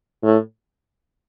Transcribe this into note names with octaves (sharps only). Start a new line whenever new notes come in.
A2